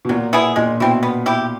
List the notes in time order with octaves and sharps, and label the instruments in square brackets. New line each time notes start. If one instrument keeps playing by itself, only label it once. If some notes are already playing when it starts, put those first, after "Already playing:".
[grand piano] B2
[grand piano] A#2 [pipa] F#3
[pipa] B3 E4 G#4
[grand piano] A#2 [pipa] G#3
[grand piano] B2 [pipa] C4 E4
[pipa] B3
E4 G4